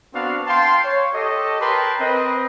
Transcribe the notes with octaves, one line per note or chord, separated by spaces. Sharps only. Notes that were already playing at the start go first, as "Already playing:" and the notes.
B3 C4 D4 F#4 F5 A5
F5 G5 A5 C6
C#5
G4 A4 C#5 D#5
A#4 B4 G5 A5 C6
C4 B4 D#5